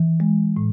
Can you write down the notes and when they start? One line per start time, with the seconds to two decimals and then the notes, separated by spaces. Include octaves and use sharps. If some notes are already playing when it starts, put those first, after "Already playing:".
Already playing: E3
0.20 G#3
0.57 A2